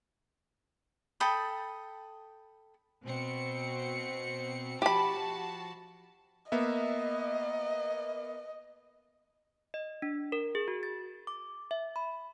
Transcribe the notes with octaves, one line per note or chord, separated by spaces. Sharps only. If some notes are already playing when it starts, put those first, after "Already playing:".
A4 G5 B5 D#6
B2 C4 C#7
F3 F#4 G4 A5 B5
A#3 B3 D#5 E5
D#5
D4
A#4
G#4
F#4
A6
D6
E5
B5